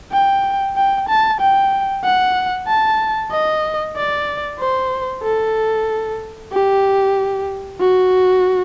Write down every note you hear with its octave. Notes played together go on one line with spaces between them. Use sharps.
G5
G5
A5
G5
F#5
A5
D#5
D5
C5
A4
G4
F#4